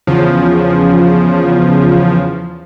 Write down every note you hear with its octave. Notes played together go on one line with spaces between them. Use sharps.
E2 C#3 F3